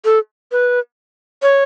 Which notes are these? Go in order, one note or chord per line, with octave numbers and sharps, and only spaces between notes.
A4
B4
C#5